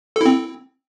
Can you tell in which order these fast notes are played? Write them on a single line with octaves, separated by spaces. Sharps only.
A4 E4 C4